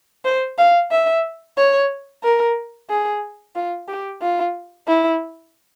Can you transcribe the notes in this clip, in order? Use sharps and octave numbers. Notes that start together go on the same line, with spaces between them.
C5
F5
E5
C#5
A#4
G#4
F4
G4
F4
E4